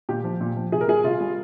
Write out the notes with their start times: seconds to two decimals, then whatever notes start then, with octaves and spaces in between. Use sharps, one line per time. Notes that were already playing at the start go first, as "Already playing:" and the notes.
0.09 A#2 G4
0.24 F3
0.41 A#2
0.56 F3
0.72 C3 G#4
0.81 A#4
0.87 G3 G#4
1.04 C3 F4
1.20 G3